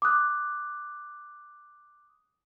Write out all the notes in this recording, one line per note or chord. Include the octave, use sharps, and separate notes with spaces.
D6 D#6 F#6